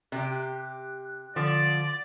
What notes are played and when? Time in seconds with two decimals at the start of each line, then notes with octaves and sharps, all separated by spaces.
0.12 C3 G4 F#6
1.36 D3 F3 D5